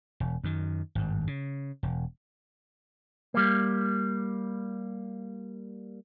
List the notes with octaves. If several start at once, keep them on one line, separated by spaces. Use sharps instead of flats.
E1
F#2 D#3
G#1 G2
C#3
E1
G3 A#3